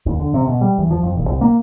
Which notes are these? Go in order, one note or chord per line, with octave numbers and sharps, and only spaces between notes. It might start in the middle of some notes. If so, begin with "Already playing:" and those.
D#2
D3
C3
B2
G3
E2
F3
F2
D#1
C2
A#3